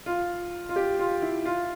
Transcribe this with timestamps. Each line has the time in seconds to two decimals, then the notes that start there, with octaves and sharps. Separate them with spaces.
0.06 F4
0.69 F4
0.76 G4
0.99 F4
1.22 E4
1.45 F4